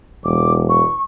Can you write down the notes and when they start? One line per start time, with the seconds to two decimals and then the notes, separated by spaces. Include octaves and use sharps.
0.24 E1 D6
0.69 C#6